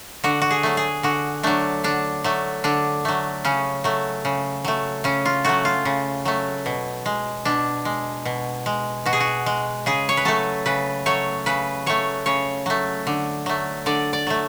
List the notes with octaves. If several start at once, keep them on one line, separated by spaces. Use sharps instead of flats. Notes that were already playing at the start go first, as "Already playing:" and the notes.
D3 F#4
F#4
G#4
F#3 A3
G#4
D3 F#4
F#3 A3 D4
D3 D4
F#3 A3
D3 D4
F#3 A3
C#3 C#4
F#3 A3
C#3
F#3 A3
C#3 C#4
F4
F#3 A3 F#4
F4
C#3
F#3 A3
B2
G#3
B2 D4
G#3
B2
G#3
B2 F#4
G#4
F#4
G#3
C#3 G#4
C#5
B4
F#3 A3 A4
C#3 B4
F#3 A3 C#5
C#3 B4
F#3 A3 C#5
C#3 C#5
F#3 A3
D3
F#3 A3
D3 D5
D5
F#3 A3